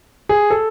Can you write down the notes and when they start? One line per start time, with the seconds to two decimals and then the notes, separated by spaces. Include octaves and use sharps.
0.29 G#4
0.51 A4